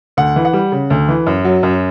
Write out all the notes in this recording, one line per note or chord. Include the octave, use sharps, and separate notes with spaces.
D2 F#5
E3
F#5
G3
C#3
D2
E3
F#2
F#3
F#2